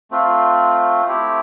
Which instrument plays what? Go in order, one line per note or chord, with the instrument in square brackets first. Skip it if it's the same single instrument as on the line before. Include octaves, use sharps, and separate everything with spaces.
[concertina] A3 C4 F4
A3 C4 E4 G4